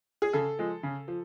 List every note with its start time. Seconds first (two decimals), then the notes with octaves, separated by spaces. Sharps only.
0.22 G#4
0.33 C#3 A4
0.59 F3 G#3
0.83 C#3
1.08 F3